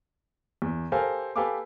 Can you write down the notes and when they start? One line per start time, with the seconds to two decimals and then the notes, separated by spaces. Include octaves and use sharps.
0.62 E2
0.92 G4 A4 A#4 C5 F5 G#5
1.36 G4 A4 B4 F5 G#5 D6